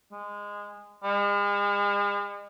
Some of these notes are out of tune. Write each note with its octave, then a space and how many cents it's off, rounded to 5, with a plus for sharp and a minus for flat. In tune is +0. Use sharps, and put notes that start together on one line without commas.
G#3 -15
G#3 -40